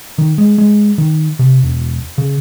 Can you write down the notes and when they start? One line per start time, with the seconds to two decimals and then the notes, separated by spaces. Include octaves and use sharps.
0.18 D#3
0.38 G#3
0.58 G#3
0.98 D#3
1.39 C3
1.63 E1
2.18 C#3